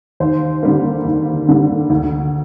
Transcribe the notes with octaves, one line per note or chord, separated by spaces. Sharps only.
D#2 C5
D3 G3 A#3
D#2
D3 G3 A#3
D2